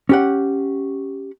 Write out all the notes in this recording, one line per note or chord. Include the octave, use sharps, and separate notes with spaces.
C#4 G4 F#5